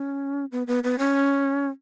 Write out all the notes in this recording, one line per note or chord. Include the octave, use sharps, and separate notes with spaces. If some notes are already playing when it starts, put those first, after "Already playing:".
Already playing: C#4
B3
B3
B3
C#4